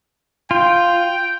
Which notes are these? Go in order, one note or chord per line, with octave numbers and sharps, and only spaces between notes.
F4 G5